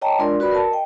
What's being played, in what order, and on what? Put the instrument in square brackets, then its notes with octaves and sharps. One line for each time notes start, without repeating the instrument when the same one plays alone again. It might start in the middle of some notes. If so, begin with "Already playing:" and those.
[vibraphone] C#5 D#5 G5 A5 A#5
G#3 D4 F4 A#4 D5 C6
F#4 B4 D5 B5
A#4 A5
D#5 G5